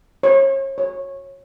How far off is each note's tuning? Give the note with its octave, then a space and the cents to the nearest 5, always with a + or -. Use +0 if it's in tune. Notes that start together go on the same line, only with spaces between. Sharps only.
C#5 -35
C#5 -15